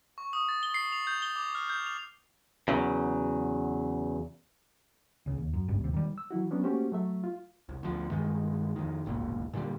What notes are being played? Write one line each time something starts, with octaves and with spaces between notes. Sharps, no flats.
C#6
D#6
A6
G7
C7
F7
G6
G7
D6
F6
G6
F7
E2 C#3 F#3
C#2 C#3
D#2
F#2
G#1 C#2 G2 B2
D#2 C3
D#3 G3
E6
E3 F#3 E4 F#4
F#3 B3 C#4 D4
A3 A#3 C#4 F#4 G4 C5
F#3 A3 E5
F4
C2
D2 F3
G2 D#3 G#3
F2 D#3
D1 G1 C#2 A#2
A#2 D3 D#3 G3